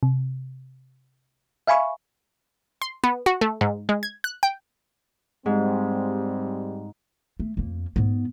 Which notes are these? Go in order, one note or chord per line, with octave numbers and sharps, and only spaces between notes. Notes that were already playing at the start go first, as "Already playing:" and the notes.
C3
E5 F5 G#5 B5 C#6
C6
B3
F#4
A3
G#2
G#3
G#6
F#6
G5
G#2 G3 G#3 C4
A3
F2 A#3
G#2 B3